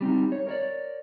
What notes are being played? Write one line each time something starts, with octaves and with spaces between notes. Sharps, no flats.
G3 C4 C#4 D#4
C#5
A#4 C#5 D5